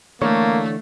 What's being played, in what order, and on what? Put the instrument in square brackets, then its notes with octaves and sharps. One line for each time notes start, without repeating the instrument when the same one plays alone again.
[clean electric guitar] D3 E3 C#5 [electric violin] A3 [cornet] A#3